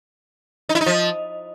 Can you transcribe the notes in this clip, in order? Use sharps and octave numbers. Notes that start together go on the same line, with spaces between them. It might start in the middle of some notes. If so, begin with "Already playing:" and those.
D#4
E4
D#4
F3